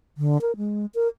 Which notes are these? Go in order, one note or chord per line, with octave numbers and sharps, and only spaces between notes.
D3
A#4
G#3
A#4